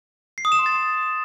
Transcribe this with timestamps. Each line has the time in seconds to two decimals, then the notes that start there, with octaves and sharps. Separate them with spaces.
0.38 C7
0.45 D#6
0.52 E7
0.59 C6
0.66 A6